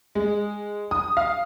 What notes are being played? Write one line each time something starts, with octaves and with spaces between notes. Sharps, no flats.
G#3
D#6
F5